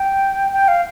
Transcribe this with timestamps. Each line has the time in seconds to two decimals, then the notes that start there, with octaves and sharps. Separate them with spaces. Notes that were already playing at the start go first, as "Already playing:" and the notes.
Already playing: G5
0.53 G5
0.68 F5